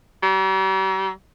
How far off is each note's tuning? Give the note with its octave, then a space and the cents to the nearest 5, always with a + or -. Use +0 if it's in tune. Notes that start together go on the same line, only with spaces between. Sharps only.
G3 -45